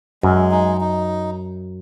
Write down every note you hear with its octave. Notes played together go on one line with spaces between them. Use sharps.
F#2 G#3
D#4
D#4